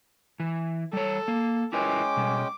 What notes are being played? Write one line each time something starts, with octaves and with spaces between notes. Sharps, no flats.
E3
G3 A4 C#5
A#3
G#3 C#4 E4 A#4 B4 G5 D6
B2 G3